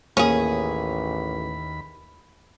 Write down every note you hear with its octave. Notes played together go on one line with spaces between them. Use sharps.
A1 D#2 A#3 C#4 G#4 B5